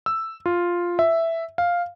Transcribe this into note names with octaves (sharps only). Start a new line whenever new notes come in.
E6
F4
E5
F5